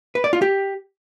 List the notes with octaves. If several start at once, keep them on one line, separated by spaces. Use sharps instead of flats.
B4
D5
F4
G4